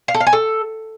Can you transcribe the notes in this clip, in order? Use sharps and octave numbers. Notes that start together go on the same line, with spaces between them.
F5
A4
F5
G#5
A4